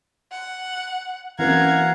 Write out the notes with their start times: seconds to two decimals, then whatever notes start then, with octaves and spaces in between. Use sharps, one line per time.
0.32 F#5
1.39 F#2 E3 A#3 C4 F5 F#5 A#5 G#6